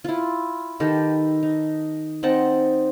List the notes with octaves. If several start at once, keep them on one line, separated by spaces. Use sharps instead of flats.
E4 F4
D#3 G4 A4 B4
D#4
C4 D#4 F#5 A5